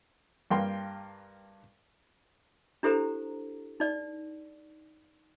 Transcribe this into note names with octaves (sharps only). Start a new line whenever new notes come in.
G2 A#3 G5 C6
D4 E4 G4 A4 C5 A#5
D#4 D5